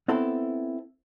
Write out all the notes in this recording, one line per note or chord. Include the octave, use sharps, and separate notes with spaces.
B3 C4 E4 A4